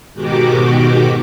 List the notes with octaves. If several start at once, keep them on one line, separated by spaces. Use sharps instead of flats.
G#2 B2 D#3 F#4 G4 D6